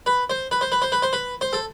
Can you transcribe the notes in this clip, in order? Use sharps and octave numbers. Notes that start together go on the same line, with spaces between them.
B4
C5
B4
C5
B4
C5
B4
C5
B4
C5
A4